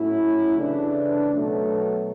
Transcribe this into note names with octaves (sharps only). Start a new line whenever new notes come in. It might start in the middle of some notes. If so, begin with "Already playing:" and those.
Already playing: A2 F#3 C#4 E4
C#3 E3 A3 D4
B2 F#3 A3